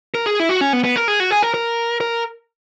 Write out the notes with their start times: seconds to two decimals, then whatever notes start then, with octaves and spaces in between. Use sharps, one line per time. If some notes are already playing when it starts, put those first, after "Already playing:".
0.15 A#4
0.26 G#4
0.40 E4
0.49 F#4
0.61 C#4
0.73 B3
0.84 B3
0.96 A#4
1.08 G#4
1.20 F#4
1.31 G#4
1.42 A#4
1.54 A#4
2.01 A#4